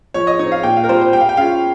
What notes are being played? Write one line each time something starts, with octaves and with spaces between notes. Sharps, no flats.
F3 C#5
D#5
C4 D#4 C#5
F5
A#2 G5
F5
A#4
G3 C4 F4 C5
C5
G3 G5
F5
G5
C#4 F4 F5